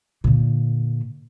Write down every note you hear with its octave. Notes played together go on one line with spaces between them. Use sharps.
A#2 D3